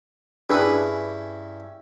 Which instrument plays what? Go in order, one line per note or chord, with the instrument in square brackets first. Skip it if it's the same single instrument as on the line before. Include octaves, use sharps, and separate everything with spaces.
[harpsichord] G2 C#4 E4 [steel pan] D4 G#4 B4